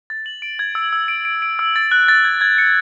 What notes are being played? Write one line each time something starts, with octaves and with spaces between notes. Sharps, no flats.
A6
F#7
D7
G#6
E6
E6
D7
D7
D7
E6
A6
F#6
A6
G#6
G#6
C#7